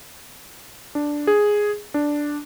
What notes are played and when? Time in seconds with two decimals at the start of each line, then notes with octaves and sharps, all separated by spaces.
0.95 D4
1.27 G#4
1.94 D4